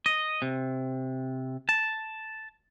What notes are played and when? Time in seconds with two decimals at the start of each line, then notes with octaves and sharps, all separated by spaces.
0.06 D#5
0.42 C3
1.69 A5